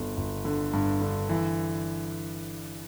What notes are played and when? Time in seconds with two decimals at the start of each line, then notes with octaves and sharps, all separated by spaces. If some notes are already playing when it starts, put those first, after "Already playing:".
Already playing: G1 D3
0.17 G1
0.45 D3
0.73 G2
1.01 D3
1.29 E3